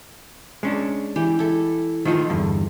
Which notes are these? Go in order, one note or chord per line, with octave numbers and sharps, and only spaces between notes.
G#3 C#4 D4
E3 G4
E4 A4
D#3 F3 A3 D#4 F4
E2 G2 D3